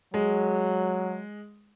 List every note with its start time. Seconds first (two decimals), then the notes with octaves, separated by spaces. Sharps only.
0.14 F#3 G#3